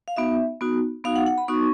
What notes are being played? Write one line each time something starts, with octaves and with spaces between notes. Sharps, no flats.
F5
B3 D#4 F#4 E5
B3 D#4 F#4
B3 D#4 F#4 F5
F#5
F#5
B5
B3 D#4 F#4 C#6